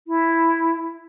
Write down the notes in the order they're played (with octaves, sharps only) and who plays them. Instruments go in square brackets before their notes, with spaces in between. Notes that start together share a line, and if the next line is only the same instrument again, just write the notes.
[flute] E4